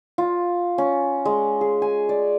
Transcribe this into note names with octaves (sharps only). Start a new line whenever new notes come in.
F4
C#4
G#3
G#4
G#5
D5